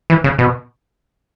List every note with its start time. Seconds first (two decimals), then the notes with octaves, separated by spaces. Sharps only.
0.10 E3
0.24 C#3
0.38 B2